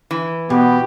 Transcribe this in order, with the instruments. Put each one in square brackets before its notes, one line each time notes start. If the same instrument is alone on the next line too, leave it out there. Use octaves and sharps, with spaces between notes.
[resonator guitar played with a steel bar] E3
[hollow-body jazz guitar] B2 [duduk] B3 [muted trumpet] G4